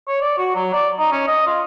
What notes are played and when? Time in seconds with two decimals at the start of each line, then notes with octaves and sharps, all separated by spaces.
0.08 C#5
0.21 D5
0.38 F#4
0.55 F#3
0.73 D5
0.99 D#4
1.12 C#4
1.27 D#5
1.46 F4